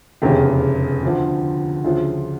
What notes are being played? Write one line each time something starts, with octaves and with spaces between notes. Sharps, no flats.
F1 E2 C#3 E3 G4
D2 D3 F3
D2 C#3 F3 F4